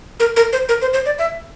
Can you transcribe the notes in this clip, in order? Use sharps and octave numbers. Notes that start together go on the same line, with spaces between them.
A#4
A#4
C5
A#4
C5
C5
D5
E5